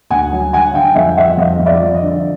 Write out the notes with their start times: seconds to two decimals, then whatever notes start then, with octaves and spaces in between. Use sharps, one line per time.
0.11 D2 F#5 G#5
0.33 F#3
0.53 D3 F#5 G#5
0.74 D3 F5 G5
0.95 F2 E5 F#5
1.17 F3 E5 F#5
1.37 F2 D#5 F5
1.59 F2
1.66 D5 E5
1.80 F3
1.95 D#5
2.02 D3